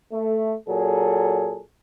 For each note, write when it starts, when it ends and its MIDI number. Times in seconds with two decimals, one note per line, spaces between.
0.12 0.53 57
0.68 1.60 46
0.68 1.60 54
0.68 1.60 68
0.68 1.60 69